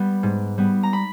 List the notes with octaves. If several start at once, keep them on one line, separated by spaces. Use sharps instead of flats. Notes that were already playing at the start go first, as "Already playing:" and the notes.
Already playing: G3 B3
G#2
G3 B3
A#5
B5